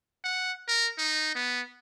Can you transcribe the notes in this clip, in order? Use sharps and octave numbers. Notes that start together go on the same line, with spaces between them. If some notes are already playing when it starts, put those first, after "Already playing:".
F#5
A#4
D#4
B3